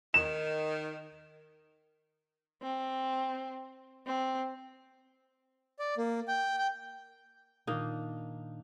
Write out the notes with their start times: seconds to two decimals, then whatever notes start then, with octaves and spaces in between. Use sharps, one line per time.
0.14 D#3 E7
2.62 C4
4.06 C4
5.79 D5
5.97 A#3
6.28 G5
6.58 G5
7.67 A#2 D#3 A#3 D4 D#4